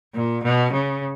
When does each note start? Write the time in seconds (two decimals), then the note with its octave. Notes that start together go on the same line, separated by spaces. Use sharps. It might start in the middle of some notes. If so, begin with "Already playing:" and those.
0.15 A#2
0.44 B2
0.73 C#3